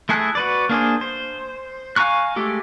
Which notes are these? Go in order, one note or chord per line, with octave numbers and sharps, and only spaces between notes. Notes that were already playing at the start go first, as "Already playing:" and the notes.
A3 E4 G#4 A5 F#6
F#4 B4 D5
A#3 D4 G#4 C5
C5
F5 G#5 A#5 C#6 F#6
G#3 A3 G4 A4